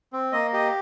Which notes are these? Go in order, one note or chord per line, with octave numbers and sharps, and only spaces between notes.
C4
A#3 D#5
G4 D#5